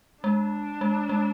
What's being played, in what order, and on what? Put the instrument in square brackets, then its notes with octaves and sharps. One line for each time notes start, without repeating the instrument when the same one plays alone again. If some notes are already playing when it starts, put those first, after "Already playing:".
[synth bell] G#3 [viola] D4
[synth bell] G#3
G#3